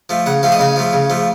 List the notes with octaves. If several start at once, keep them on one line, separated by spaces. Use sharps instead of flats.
F3 A3
C#3 F#5
F3 A3 F5
D#5
C#3 F5
F3 A3
C#3
F3 A3